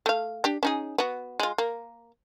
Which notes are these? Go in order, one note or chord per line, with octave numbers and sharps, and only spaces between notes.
A3 F5
D4 G4
C#4 D#4 G#4
B3 F#4
G#3 F4
A#3